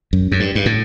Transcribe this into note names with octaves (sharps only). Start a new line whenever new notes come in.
F#2
F#2
G2
G2
A2